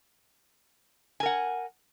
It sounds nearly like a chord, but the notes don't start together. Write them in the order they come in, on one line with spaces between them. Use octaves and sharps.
G#5 A#4 F#5